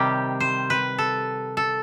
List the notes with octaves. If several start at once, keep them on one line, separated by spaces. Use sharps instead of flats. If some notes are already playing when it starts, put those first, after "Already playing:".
Already playing: C3 D#3 G3 G4
C5
B4
A4
A4